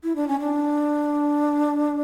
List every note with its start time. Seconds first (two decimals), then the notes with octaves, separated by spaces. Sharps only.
0.03 E4
0.16 D4
0.28 C#4
0.40 D4